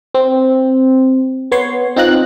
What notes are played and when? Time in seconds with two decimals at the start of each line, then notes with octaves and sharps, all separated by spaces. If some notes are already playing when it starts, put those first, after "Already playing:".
0.14 C4
1.52 B3 C#5 C6
1.96 C4 D#4 F4 A#5 F#6